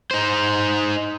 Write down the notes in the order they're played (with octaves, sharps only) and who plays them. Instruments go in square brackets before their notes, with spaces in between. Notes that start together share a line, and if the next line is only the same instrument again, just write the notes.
[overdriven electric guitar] D#4 C5